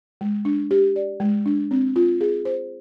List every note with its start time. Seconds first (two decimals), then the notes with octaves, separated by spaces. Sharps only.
0.21 G#3
0.45 D4
0.71 G4
0.96 D5
1.20 G#3
1.46 D4
1.71 C4
1.96 F4
2.21 G#4
2.45 C5